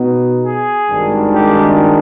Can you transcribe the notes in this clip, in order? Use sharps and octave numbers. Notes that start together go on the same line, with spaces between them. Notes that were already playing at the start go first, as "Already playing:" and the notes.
Already playing: B2 B3 D#4
G#4
G#1 G2 D#3 G#3 D4
G4